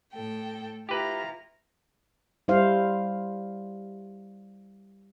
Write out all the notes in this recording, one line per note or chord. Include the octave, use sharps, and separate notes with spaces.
A2 A4 G5
E4 F4 G4 B4 A#5
G3 E4 C5 F5